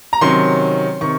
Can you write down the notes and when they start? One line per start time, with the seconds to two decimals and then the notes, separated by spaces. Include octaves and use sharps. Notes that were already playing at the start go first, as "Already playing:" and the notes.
0.13 A#5
0.21 C3 D#3 F#3 C#4 C6
1.01 C3 D#3 C#6